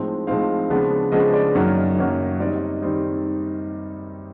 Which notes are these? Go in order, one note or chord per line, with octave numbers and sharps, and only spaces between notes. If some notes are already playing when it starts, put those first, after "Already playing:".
Already playing: A2 F3 G#3 C4 D#4
A2 F3 G#3 C4 D#4 F5
C#3 F3 G#3 B3 D4
C#3 F3 G#3 B3 D4 D#5
D5
F#2 D#3 F#3 A#3 C#4
D#5
F#2 D#3 F#3 A#3 C#4
D#3 G3 C4 D#4 D5
D#5
D5
D#3 G3 C4 D#4